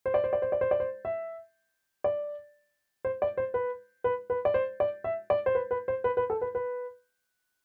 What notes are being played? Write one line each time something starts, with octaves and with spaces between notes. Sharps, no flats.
C5
D5
C5
D5
C5
D5
C5
D5
C5
E5
D5
C5
D5
C5
B4
B4
B4
D5
C5
D5
E5
D5
C5
B4
B4
C5
B4
B4
A4
B4
B4